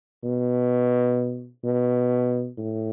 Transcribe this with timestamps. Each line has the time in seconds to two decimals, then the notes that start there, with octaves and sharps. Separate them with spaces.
0.23 B2
1.64 B2
2.58 A2